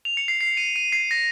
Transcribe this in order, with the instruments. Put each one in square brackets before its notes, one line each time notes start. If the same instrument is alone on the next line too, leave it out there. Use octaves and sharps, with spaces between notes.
[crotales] F7
C#7
C7
C7
D#7
D#7
C7
A#6